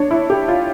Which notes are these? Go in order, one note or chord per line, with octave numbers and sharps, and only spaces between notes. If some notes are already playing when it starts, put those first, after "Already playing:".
Already playing: D4 C#5
E4
G4
F4